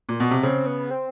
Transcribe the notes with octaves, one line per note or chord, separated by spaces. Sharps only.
A#2
B2
C3
C#3 C4
B3
C4